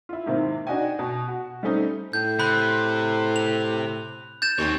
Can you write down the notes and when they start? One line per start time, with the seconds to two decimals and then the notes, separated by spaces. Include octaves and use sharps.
0.09 E4 F4
0.26 G#2 C3 D#3 A#3 C4 E4
0.67 D4 D#4 F#4 D#5 G5 G#5
0.99 B2
1.28 F#4
1.63 G3 A3 C4 C#4 D#4
2.13 A2 G6
2.40 C3 B5 F#6
3.36 F7
4.42 G6 A6 E7
4.59 D#2 C4 C#5